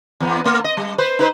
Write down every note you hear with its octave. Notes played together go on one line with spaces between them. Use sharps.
E2 B3
A3
D#5
G3
B4 C5
D#4 B4 C5